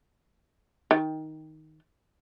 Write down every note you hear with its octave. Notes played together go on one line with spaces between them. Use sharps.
D#3